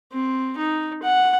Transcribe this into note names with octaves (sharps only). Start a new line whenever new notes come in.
C4
D#4
F#5